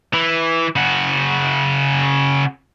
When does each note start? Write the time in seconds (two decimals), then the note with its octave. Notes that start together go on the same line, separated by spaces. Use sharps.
0.14 E3
0.76 C#3 F#4